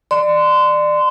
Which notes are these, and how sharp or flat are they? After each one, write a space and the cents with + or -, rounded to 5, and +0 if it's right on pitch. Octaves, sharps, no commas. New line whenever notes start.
D5 +25 C6 -25